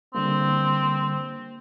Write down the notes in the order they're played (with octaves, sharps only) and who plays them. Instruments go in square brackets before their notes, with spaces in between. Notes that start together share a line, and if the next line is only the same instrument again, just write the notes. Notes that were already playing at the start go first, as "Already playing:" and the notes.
[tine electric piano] D3 G3 A#3 [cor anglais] C4